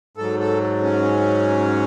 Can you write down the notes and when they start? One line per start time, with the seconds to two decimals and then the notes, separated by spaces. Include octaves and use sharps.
0.17 G#2 F#3 A4
0.40 A4
0.83 C#4